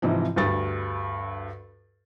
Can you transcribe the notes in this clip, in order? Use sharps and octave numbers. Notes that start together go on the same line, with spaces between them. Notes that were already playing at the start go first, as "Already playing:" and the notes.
G#2 C3 E3 F3
D2 G2 A6